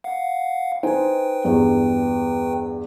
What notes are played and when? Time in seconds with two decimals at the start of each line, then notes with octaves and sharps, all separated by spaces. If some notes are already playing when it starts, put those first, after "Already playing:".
0.04 F5 F#5
0.83 D#4 B4 C5 G5 G#5
1.44 E2 G2